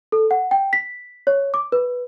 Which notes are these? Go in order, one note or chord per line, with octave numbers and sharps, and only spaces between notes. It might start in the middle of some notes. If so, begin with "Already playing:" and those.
A4
F#5
G5
B6
C#5
D6
B4